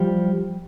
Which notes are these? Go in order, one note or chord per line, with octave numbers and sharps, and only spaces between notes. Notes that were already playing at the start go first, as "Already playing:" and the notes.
Already playing: F3 G3